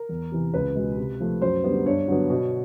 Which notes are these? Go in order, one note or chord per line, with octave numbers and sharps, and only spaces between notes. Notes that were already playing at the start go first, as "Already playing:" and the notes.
Already playing: A#4
E2
C3 E3
C#2 B4
B2 G#3
C3
F3 A3
F#2 C5
D3 G3 B3
G2 C#5
D3 F#3 B3
B2